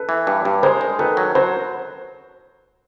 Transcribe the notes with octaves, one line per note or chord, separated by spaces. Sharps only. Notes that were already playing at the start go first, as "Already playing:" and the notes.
Already playing: A4 B4
E3
G2
G2
G#3 A#4 C5
G#3
D#3 A4 B4
F#3
F#3 A#4 C5